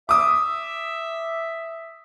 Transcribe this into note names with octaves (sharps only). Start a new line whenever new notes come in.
E5 D6 D#6